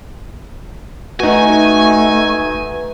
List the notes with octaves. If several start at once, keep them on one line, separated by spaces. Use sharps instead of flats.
A3 D#4 F#4 B4 G#5